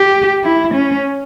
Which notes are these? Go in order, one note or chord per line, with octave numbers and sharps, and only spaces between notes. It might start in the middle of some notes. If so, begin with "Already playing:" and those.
Already playing: G4
E4
C#4